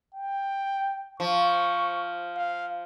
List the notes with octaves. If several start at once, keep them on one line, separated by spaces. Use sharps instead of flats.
G5
F3 C#6
F5